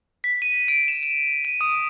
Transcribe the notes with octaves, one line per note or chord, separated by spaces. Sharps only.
B6
D#7
D7
E7
E7
D#7
D#6